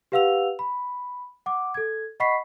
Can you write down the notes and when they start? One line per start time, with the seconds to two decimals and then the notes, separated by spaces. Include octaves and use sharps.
0.12 G4 B4 F5 F#5 E6 F7
0.59 B5
1.46 F#5 D6
1.74 A4 G#6
2.20 D#5 F#5 B5 C#6 B6 C7